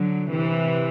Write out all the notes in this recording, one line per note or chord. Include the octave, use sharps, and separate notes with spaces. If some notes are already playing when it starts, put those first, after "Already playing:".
Already playing: D3 F#3
C3 E3